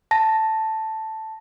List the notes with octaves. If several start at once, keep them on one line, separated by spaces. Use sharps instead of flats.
A5 A#6